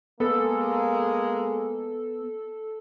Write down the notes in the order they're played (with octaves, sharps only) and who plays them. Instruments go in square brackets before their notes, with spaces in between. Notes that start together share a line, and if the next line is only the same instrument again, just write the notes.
[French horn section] G#3 A#3 [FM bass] B3 [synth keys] A4